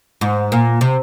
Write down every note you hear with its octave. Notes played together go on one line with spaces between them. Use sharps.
G#2
A#2
C3